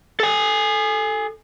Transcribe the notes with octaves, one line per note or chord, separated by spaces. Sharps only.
A4 G#5